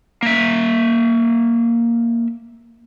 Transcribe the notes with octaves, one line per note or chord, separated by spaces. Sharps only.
A#3 E5